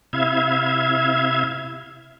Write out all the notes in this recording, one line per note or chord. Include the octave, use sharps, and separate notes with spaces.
C3 E4 E5 F5 G#6